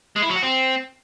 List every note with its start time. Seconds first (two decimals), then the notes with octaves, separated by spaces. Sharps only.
0.16 G#3
0.23 E4
0.29 F#3
0.36 F#4
0.43 C4